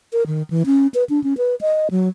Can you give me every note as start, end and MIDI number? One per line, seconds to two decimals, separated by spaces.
0.13 0.23 70
0.27 0.43 51
0.50 0.63 52
0.66 0.87 61
0.94 1.04 71
1.10 1.22 62
1.24 1.34 61
1.38 1.55 71
1.61 1.88 75
1.91 2.08 54